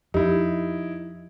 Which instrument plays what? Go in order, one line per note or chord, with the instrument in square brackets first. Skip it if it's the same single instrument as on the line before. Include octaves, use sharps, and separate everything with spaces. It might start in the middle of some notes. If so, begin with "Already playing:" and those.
[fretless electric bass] F2 [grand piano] D#4 E4 [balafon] G4